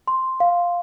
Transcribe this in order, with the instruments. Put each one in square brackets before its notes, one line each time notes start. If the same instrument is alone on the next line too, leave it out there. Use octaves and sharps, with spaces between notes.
[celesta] C6
F5